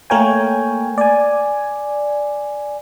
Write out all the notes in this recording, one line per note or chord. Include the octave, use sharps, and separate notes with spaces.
A3 A#3 A#4 C#5 G5 G#5
D5 G#5